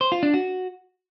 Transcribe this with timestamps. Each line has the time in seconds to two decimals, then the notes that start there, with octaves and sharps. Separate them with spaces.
0.01 C5
0.12 F4
0.23 D4
0.34 F#4